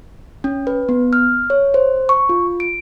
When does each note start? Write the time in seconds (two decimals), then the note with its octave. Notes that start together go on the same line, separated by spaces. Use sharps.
0.44 C#4
0.67 B4
0.89 B3
1.13 F6
1.50 C#5
1.74 C5
2.09 C#6
2.29 F4
2.60 D7